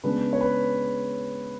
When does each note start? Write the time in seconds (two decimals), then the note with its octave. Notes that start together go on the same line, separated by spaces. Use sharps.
0.04 C#3 G#3 B3 D4 B4
0.33 C#5
0.41 B4